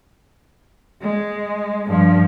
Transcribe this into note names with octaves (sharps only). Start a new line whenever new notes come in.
G#3
G2 F3